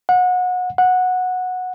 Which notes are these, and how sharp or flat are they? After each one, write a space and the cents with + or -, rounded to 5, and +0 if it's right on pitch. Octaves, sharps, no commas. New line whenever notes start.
F#5 -30
F#5 -15